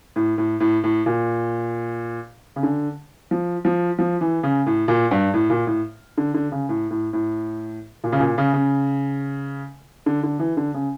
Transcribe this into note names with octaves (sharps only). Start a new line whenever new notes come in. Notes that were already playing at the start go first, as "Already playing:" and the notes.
A2
A2
A2
A2
A#2
C#3
D3
F3
F3
F3
E3
C#3
A2
A#2
G2
A2
A#2
A2
D3
D3
C#3
A2
A2
A2
A#2
C#3
A#2
C#3
C#3
D3
D3
E3
D3
C#3